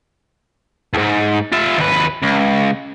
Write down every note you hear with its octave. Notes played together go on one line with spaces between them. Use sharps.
D#2 G#2
F4 E5
D#2 B4
C#2